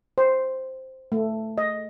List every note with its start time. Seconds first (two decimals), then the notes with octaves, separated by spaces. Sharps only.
0.18 C5
1.12 A3
1.58 D#5